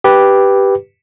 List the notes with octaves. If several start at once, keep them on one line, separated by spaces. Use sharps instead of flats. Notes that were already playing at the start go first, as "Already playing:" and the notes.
G4 B4